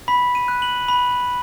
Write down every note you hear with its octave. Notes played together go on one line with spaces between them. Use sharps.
B5 B6
D#7
F#6
F#7
B5